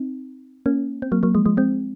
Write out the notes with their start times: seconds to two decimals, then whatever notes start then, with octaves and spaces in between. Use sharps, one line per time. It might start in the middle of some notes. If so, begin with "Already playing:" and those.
Already playing: C4 D#4
0.66 A#3 C#4
1.02 C4
1.12 F#3 A#3
1.23 F#3 A#3
1.35 F3 G#3
1.46 F3 G#3
1.57 G#3 C4